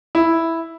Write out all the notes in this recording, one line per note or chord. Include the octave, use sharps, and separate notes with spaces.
E4